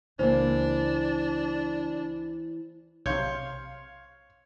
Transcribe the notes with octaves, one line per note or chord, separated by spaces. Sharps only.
C#2 E3 A#3 D4 C5
B1 C3 C#5 F5 C6 G6